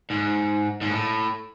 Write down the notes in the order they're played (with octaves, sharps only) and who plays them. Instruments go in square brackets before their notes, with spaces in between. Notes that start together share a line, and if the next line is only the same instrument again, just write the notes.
[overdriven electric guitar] G#2
G#2
A2